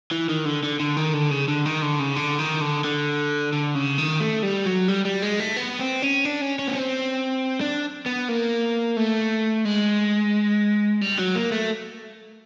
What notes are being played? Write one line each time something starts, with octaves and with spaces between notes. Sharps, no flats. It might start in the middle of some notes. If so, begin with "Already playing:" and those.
E3
D#3
D3
D3
D3
D#3
D3
C#3
D3
D#3
D3
C#3
D3
D#3
D3
D3
D3
C#3
D#3
A3
G3
F#3
G3
G3
G#3
A3
B3
C4
C#4
D4
C#4
C#4
B3
C4
D4
B3
A#3
A3
G#3
G3
F#3
A#3
A3